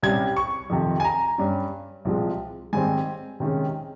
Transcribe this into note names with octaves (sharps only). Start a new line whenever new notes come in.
C2 C3 G3 C#4 G#6
C#6
F2 C3 D#3
G#5
A#5
G2 G3 C#4
C2 C3 F3 G#3
G#2 D#3 G3 C4 G#5
C3 D#3 G#3 C#4